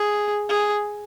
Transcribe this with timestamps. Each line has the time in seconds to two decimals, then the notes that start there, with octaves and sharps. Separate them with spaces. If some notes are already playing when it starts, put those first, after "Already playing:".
Already playing: G#4
0.49 G#4